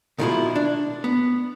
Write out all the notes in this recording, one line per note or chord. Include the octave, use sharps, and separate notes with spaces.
B2 D#3 F3 G#3 E4 F4
D4
B3